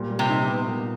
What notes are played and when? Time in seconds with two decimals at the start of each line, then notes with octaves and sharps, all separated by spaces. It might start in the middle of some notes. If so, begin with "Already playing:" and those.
Already playing: A#2 G3
0.10 G3
0.19 C3
0.29 D#4
0.48 B3
0.67 A#2